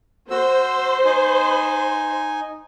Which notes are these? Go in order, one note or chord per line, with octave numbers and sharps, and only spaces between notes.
F#4 C5 E6
D#4 G#5